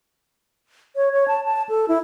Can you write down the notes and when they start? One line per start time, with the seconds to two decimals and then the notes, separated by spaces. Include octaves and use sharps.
0.96 C#5
1.13 C#5
1.28 A5
1.45 A5
1.69 A4
1.88 E4